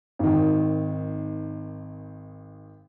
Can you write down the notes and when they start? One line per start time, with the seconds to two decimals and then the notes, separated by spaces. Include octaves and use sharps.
0.19 G#1 D#3